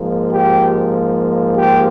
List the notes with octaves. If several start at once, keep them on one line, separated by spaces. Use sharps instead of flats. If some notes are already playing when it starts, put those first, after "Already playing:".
Already playing: G#2 F3 A#3
G4
G4